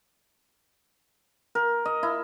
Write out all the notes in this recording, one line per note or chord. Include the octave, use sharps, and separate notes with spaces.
A#4
D#5
E4